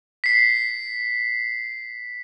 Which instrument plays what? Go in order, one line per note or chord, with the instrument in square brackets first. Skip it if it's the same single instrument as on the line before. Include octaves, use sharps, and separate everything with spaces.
[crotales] B6 C7